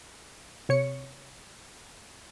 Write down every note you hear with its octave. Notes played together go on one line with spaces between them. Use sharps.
C3 C#5 C#7